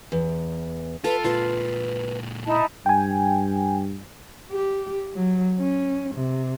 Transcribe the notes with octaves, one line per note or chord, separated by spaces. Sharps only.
E2
F4 A4 B4
A#2 G#3 F4 B4 C6
D#4 E4 A5
G2 G5 G#5
G4
F#3
C#4
C3